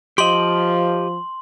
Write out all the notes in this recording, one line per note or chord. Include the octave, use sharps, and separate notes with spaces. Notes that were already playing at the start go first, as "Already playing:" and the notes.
F3 G4 D#5 C6 F#7